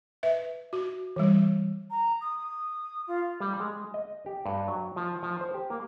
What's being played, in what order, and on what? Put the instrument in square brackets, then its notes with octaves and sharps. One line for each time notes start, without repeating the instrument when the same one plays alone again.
[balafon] B4 E5
F#4
E3 G3
[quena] A#5
D#6
F4
[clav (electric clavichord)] G3
G#3
D#5
G4
G2
F#3
F3
F3
C5
G4
A#3